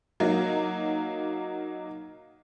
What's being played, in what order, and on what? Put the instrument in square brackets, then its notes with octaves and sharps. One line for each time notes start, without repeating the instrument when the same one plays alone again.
[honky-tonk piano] F#3 A#3 D#4